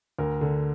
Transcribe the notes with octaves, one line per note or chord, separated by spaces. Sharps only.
D2 A#4
D3